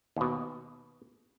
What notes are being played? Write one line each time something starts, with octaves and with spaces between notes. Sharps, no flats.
D#2 B2